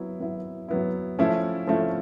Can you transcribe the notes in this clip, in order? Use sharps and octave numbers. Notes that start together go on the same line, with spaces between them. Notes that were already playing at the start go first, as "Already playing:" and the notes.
Already playing: F#3 B3 E4
F#3 B3 E4
F#3 B3 E4
F3 A3 C#4 E4
F3 A3 C#4 E4